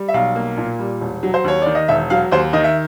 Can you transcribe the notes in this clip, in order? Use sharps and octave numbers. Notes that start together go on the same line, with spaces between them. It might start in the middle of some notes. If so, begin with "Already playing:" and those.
Already playing: G3
E5
B1 F5
A#3
A#2
G3
E1
F#3
C5
D#2 C#5
D#3 D5
D#5
E1 E5
F#3 F5
D#2 C5
D#3 D#5
E5